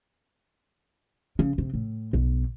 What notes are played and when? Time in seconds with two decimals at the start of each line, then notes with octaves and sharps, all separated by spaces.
1.39 C#3
1.58 C3
1.74 A2
2.13 B1